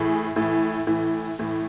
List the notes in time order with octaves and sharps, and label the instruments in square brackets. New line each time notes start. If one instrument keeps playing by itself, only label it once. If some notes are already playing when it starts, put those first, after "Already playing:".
Already playing: [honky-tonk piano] A2 E3 G#4
A2 E3
A2 E3
A2 E3